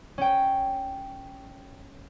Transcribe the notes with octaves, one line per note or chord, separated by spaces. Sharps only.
C#4 G5